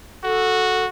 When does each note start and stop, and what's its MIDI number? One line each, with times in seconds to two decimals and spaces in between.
0.23 0.88 66
0.23 0.85 69